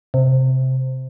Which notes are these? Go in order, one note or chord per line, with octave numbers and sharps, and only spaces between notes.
C3